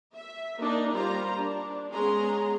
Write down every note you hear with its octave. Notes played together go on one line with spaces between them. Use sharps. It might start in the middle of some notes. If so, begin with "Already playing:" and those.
E5
A#3 D4 D#4
G3 A#3 F4 C5 A#5
D4
G#3 B3 C#4 G#4 A#5 C6